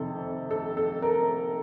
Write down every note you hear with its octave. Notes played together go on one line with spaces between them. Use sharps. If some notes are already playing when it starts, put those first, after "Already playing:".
Already playing: F2 C3 D#3 A4
A4
A4
A#4